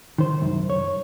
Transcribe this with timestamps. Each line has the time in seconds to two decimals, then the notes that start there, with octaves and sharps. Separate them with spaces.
0.18 D#3 C5
0.41 C2 F#2
0.70 C#5